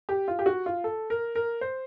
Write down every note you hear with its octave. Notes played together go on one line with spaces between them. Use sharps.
G4
F4
G4
F#4
F4
A4
A#4
A#4
C5